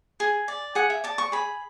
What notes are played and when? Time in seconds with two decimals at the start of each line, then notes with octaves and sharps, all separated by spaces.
0.20 G#4 G#5
0.48 D5
0.75 G#4 F#5
0.90 E5
1.04 D5 A5
1.18 C#6
1.32 G#4 B5